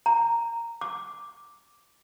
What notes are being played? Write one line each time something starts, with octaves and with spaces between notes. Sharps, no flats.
A#5
D6